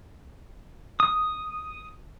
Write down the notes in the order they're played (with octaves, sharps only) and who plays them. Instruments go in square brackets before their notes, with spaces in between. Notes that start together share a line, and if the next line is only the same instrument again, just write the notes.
[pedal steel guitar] D#6